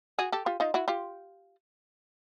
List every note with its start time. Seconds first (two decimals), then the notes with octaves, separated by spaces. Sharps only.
0.19 F#4 G#4
0.32 G4 A4
0.46 F4 G4
0.60 D#4 F4
0.74 E4 F#4
0.88 F4 G4